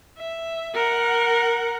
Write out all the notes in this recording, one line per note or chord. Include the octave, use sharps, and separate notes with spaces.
E5
A#4 F#5